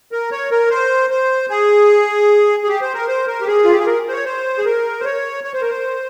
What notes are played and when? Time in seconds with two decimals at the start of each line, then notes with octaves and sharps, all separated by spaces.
0.12 A#4
0.32 C#5
0.51 A#4
0.71 C5
1.11 C5
1.50 G#4
2.63 G#4
2.68 G4
2.81 C5
2.94 A#4
3.08 C5
3.27 A#4
3.41 G4
3.47 G#4
3.64 F4
3.72 G4
3.79 G#4
3.87 A#4
4.08 C5
4.12 C#5
4.25 C5
4.58 G#4
4.65 A#4
5.00 C5
5.05 C#5
5.44 C#5
5.53 C5
5.62 A#4
5.70 C5